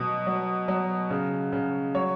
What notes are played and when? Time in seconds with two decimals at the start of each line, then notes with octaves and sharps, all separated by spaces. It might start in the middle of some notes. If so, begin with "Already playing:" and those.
Already playing: B2 F#3
0.27 F#3
0.68 F#3
1.10 C#3
1.53 C#3
1.95 F#3 C#5